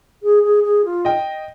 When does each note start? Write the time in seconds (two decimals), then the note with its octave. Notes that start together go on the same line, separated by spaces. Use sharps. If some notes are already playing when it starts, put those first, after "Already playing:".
0.23 G#4
0.43 G#4
0.64 G#4
0.85 F4
1.05 D#5 G5